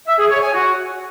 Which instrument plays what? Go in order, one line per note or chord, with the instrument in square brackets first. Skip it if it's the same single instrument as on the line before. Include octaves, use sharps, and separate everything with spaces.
[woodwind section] E5
G#4
C#5
G#5
F#4